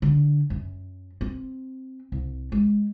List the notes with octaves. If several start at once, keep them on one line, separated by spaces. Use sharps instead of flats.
D3
F#2
C4
C2
G#3